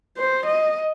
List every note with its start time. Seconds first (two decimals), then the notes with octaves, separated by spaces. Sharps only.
0.18 C5
0.47 D#5